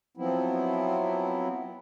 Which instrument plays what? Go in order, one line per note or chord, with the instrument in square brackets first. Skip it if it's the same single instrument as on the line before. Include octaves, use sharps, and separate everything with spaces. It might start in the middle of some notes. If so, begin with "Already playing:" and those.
[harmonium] F3 F#3 B3 C4 E4